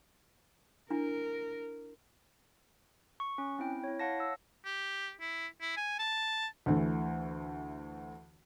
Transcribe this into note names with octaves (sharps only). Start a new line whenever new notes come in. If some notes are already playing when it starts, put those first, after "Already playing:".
D4 E4 A#4
C#6
C#4
C4 E4 G5
E4 C#5
C#5 F5 F#5 A5 A#6
E6
G4
E4
E4
G#5
A5
D2 E3 A3